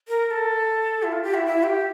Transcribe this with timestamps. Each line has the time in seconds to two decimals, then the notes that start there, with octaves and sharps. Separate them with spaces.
0.08 A#4
0.26 A#4
0.30 A4
1.03 E4
1.12 F4
1.23 G4
1.34 E4
1.46 E4
1.63 G4